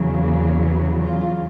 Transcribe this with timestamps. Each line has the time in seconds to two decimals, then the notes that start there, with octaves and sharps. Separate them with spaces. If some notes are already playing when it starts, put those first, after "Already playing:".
Already playing: E2 C#3 F#3
0.21 A#3
0.60 B3
0.98 F4